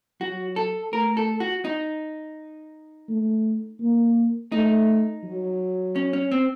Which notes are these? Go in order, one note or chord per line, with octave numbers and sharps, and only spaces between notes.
F#3 F#4
A4
A3 A#4
A4
F#4
D#4
A3
A#3
A3 D#4
F#3
C#4
C#4
C4